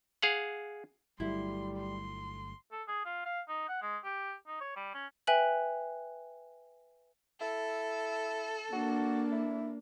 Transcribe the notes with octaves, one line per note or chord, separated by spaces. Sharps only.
G#4 F5 F#5
G1 F#3 G3 A3 E4 C6
C6
A4
G#4
F4
F5
D#4
F#5
G#3
G4
D#4
C#5
G3
C#4
B4 E5 G5 G#5 F#6 F#7
E4 A4
A#3 D4 F#4
E4